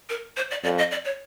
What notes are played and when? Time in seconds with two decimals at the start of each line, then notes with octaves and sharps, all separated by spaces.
0.09 A#4
0.37 C5
0.51 D5
0.64 F2 D5
0.78 D#5
0.91 D5
1.05 C#5